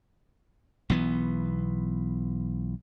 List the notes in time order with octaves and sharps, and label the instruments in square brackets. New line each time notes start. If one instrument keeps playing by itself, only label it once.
[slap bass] B1 E3 B3